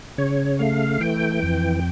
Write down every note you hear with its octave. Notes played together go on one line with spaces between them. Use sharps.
C#3 C#5
A3 F5
E3 G5
F2